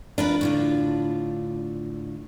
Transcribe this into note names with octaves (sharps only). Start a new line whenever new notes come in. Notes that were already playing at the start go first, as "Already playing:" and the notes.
D4 F4 A#4 B4
A2 D3 F4